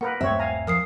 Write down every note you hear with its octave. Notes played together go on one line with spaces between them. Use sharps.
A#3 A#4 B4 F#5
D#1 G2 A3 C4 C#5 E5
F5 G#5 A#5
F3 A#4 D#6 C7